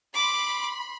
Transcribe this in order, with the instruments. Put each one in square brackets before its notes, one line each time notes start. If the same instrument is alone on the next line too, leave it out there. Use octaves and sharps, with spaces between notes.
[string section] B5 C6 [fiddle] D6